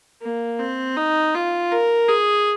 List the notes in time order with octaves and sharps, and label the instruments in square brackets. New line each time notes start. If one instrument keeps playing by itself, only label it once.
[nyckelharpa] A#3
C4
D#4
F4
A#4
G#4